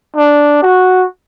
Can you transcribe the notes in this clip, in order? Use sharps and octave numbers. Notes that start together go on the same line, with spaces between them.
D4
F#4